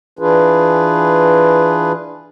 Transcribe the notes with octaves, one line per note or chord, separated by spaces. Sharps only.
E3 D4 F4 G#4 B4